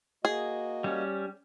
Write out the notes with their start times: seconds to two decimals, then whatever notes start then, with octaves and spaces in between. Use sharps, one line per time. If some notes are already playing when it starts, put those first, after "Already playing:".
0.25 A#3 F#4 G#4 D#5
0.84 G3 C#4